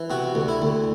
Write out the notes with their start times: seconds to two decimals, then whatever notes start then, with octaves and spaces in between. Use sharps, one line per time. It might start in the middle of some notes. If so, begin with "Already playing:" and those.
Already playing: E3
0.10 C3 F#4
0.35 D2
0.48 E4
0.62 D2